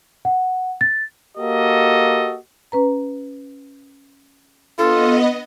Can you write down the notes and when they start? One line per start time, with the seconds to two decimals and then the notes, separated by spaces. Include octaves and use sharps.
0.25 F#5
0.81 A6
1.37 A#3 F#4 G4 A4 D#5
2.72 C#4 B4 A#5
4.79 B3 D4 F4 A4 D#5